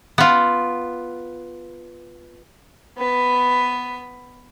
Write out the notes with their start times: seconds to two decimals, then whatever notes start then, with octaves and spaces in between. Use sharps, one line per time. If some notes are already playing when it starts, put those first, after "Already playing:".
0.18 B3 F4
2.97 B3 B4